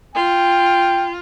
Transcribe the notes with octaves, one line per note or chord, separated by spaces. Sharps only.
F4 G5